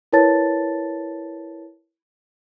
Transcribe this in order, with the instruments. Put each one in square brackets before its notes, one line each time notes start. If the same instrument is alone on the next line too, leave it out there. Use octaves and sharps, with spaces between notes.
[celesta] E4 A#4 B4 C#5 A5 A6